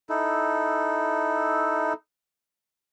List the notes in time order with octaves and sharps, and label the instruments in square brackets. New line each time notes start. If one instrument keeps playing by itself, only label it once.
[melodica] D#4 E4 A4